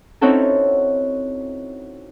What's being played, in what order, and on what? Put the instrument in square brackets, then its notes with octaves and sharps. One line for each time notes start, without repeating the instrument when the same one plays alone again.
[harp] C4 C#4 D#4 E4 F#4 A4